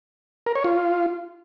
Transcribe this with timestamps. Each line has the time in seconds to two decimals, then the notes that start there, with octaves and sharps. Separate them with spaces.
0.46 A#4
0.55 C#5
0.64 F4